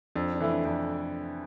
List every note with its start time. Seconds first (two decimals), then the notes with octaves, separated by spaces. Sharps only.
0.15 F2 D4
0.34 D4
0.40 E3 A3 E4
0.51 D4
0.65 F2 D4